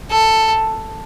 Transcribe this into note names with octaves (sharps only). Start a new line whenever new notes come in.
A4